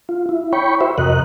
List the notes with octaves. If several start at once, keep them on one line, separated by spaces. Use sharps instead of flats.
F4
E4
C#5 G5 B5 C#6
F#4 C5 E5
F2 C3 A#4 D#5 F#6